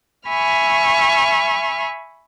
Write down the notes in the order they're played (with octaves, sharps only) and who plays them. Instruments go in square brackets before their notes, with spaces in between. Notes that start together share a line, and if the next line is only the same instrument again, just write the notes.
[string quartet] E5 G#5 B5 C#6 F6